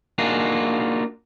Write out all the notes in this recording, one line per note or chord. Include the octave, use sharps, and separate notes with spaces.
A#3 D4 D#4 F4 F#4 G#4